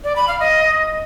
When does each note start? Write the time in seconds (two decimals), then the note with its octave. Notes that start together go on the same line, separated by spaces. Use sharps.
0.04 D5
0.16 B5
0.28 F5
0.40 D#5